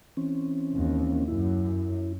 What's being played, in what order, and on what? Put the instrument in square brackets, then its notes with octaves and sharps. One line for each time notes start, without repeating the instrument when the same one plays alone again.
[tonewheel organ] E3 C4 C#4
[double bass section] D#2
[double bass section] F#2 [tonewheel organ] E4